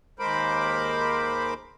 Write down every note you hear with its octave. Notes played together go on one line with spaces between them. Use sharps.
D#2 G#3 A#4 C5 B5 D6